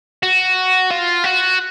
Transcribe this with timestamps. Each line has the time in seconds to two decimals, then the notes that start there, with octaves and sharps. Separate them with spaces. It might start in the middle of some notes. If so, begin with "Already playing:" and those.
0.23 F#4
0.91 F4
1.24 F#4